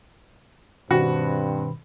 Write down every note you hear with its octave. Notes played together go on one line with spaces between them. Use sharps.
G2 B2 D#3 C4 F#4 B5